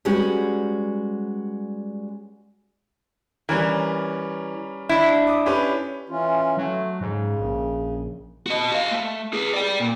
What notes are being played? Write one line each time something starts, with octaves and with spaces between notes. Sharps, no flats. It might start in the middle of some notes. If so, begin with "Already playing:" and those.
G3 G#3 B3 C#4 F#4 G4
E3 G3 C#4 A#4
D4 E4
D6 D#6
C#4 G4 B4
E3 C#4 F4
F#3 A3
G#2 C#3
A#1
F#4 D#5
F#4 F5
A3
G#4 B4
D5 G5
A#2